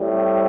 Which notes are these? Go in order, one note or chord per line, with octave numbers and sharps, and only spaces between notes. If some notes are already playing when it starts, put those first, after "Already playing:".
Already playing: A2 G3 C4